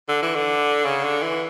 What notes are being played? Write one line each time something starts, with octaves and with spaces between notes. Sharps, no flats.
D3
E3
D3
C#3
D3
E3